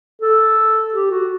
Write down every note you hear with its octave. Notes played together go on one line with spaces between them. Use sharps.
A4
G4
F#4